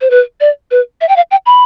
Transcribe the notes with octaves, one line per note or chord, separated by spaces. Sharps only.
C5
B4
D5
B4
E5
G5
F5
G5
B5